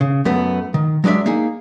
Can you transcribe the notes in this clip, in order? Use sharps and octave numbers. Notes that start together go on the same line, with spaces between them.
C#3
F#2 A3 B3
D#3
F#3 G#3 D4 D5 E5
A#3 D#4 G#4